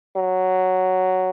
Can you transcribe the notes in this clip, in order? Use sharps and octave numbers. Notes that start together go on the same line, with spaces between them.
F#3